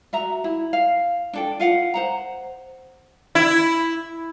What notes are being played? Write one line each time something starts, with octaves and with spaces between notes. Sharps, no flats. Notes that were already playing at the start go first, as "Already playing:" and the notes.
F#4 E5 A#5
E4
F5
D4 A4 G5
F4 F5 F#5
C5 F#5 A#5
E4